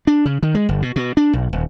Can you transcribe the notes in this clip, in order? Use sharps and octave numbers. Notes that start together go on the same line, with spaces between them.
D4
C#3
D#3
G#3
G1
B2
B2
D4
B1
D#1